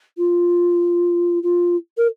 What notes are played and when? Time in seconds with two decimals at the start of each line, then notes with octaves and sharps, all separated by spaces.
0.18 F4
1.43 F4
1.97 A#4